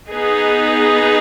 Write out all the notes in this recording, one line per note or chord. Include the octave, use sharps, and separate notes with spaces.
B3 D#4 G#4 B4